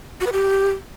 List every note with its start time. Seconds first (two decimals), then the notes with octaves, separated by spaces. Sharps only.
0.21 F#4
0.26 B4
0.32 G4